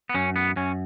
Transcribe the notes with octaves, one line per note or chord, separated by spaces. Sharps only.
B3
F#2 C#4
B3
F#2 C#4